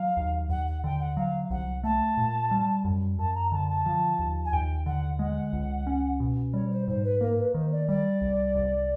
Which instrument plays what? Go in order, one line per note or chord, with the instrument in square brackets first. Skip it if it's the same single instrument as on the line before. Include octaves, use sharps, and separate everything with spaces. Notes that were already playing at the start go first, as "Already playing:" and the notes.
Already playing: [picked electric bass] F#3 [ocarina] F5
[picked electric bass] D#2
[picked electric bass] D#2 [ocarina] F#5
[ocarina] F#5
[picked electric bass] D3 [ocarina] G5
[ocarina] F#5
[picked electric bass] F#3 [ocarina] F5
[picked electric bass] C2 [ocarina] F#5
[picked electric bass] A3 [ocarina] A5
[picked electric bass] A#2
G3
F#2
[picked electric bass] F#2 [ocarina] A5
[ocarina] A#5
[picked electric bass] D3 [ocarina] A5
[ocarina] A5
[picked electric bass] F3
D#2
[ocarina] G#5
[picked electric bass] D#2 [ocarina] G5
[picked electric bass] D3 [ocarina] F#5
[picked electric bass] G#3 [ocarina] F#5
[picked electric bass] C#2
C#4
B2
[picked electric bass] G3 [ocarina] C#5
[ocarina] C5
[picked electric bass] G#2 [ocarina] C5
[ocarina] B4
[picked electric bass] A#3 [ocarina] A#4
[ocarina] B4
[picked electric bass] D#3 [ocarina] C5
[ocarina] D5
[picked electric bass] G3 [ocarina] D5
[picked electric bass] C2
C2